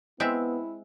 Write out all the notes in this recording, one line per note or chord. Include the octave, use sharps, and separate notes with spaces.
G#3 B3 C4 E4 E5